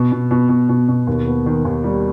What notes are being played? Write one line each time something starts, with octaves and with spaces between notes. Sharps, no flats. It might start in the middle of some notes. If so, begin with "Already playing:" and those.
Already playing: B2
B2
B2
B2
B2
B2
D#2
B3
D#3
D#2
G3